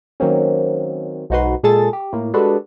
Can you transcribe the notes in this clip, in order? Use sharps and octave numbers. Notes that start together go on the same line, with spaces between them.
D#3 F#3 A#3 C4 C#4
B1 G#2 D#4 F#4 B4 C6
A#2 G#3 G#4 A4 A6
G4
A2 A#3
G3 G#3 D4 F#4 A4 B4